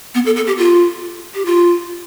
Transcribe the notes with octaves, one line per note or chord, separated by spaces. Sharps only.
B3
A4
A4
G4
F4
G4
F4